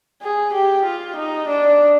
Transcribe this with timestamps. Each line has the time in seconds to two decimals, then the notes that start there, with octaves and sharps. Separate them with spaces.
0.22 G#4
0.54 G4
0.86 F4
1.17 D#4
1.48 D4